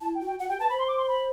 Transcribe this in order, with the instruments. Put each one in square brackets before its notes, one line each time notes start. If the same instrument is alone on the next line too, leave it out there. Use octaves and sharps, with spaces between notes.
[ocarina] E4 [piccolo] A5
[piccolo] G5
[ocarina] F#4
[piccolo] G5
[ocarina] F#4 [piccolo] F#5
[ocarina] G4 [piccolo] G5
[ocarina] B4 [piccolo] A5
[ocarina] C5 [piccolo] B5
[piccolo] C6
D6
C6
B5